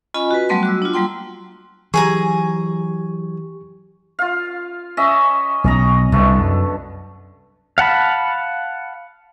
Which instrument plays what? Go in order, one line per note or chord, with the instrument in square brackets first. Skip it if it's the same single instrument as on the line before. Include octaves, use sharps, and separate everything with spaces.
[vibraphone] C#4 F4 D#5 G#5 B5
F#4 B4
F#3 G3 A3 B3 A5 C6
F#4 D6 E6
D4 F4
F#3 G3 A#3 G5 C6
[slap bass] E3 F#3 [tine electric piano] G4 C#6 [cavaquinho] G#4 G#5 A#5
[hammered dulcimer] F4 F5
C#4 D#5 E5
[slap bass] B1 [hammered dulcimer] C#4 D#5 A#5
[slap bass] C2 [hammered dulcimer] B2 D3 A3
[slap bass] F#2
[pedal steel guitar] F5 F#5 A5 B5